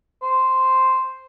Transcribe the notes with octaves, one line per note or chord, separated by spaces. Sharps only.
C5